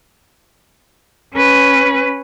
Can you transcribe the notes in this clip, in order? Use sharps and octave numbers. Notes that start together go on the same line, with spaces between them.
C#4 B4